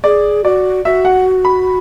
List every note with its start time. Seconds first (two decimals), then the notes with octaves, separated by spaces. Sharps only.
0.04 G#4 D5
0.44 F#4 D5
0.85 F#4 E5
1.05 F#5
1.45 B5